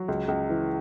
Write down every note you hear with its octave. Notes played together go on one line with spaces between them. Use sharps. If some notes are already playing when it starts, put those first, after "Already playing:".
Already playing: F#3
C#2
C#2
E3